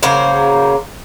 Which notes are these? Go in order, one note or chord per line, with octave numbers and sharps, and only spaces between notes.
C#3 F#3 A#3 C5